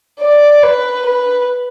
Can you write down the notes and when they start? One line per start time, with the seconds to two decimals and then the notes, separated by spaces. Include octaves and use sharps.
0.21 D5
0.63 B4
1.06 B4